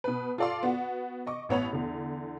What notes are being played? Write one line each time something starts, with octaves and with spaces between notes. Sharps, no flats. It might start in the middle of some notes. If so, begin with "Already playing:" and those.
B2 B4
F4 A4 D5 F5 C6
B3 F#4
D#5 C#6 D6
A1 B3 C#5 B5 F7
E2 D3